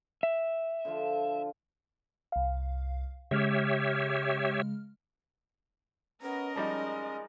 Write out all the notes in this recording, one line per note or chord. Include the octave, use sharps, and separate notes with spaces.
E5
D3 F3 F4
C2 F5
C#3 G#3 G4 C#5 E5 F6
B3 C#4 A#4 D#5
F3 G3 G#3 D#4